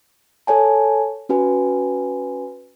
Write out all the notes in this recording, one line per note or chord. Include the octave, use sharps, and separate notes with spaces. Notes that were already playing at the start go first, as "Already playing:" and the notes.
A4 C#5 G#5 A5
C#4 F#4 B4 G#5